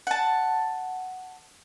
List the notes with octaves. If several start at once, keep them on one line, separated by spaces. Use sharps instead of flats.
F#5 A5